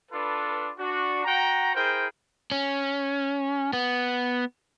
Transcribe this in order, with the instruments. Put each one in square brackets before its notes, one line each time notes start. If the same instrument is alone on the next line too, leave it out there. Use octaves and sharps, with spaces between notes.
[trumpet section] D4 F4 A4 B4
D4 F#4
F#4 F#5 G5 A#5
E4 G#4 A#4 C5 G5
[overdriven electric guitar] C#4
B3